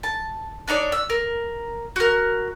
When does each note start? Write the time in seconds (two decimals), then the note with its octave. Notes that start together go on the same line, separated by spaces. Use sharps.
0.03 A5
0.68 D4 D#4 C#5 D5
0.92 E6
1.10 A#4
1.96 F#4 A#4